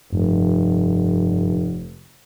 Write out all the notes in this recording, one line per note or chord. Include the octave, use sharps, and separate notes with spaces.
F1 G2